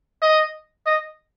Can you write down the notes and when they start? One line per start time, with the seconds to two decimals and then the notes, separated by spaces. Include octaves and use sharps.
0.22 D#5
0.86 D#5